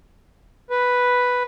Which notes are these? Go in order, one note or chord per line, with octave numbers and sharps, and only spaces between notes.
B4